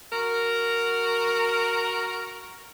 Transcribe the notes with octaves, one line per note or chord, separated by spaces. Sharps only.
F#4 A#4